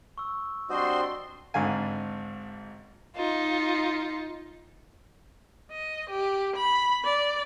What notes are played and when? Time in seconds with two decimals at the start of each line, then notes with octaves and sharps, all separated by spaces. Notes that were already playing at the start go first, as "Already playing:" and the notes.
0.18 C#6 E6
0.70 G3 C4 D4 F#4 C5 D#5 C6
1.54 G#1 G#2 D3 F5 G#5
3.16 D#4 F4
5.71 D#5
6.10 G4
6.56 B5
7.05 D5